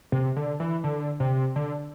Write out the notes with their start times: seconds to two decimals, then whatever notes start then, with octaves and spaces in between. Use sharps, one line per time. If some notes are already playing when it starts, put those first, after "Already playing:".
0.12 C3
0.36 D3
0.60 E3
0.84 D3
1.20 C3
1.56 D3